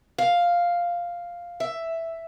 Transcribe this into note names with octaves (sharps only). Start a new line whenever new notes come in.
F5
E5